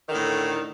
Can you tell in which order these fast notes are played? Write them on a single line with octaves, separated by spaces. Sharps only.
D#3 D3 A2